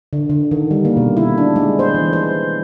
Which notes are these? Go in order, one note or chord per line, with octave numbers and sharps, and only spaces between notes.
D3
D3
D#3
G3
A#3
B2
E4
D4
G#3
C5
E3
C5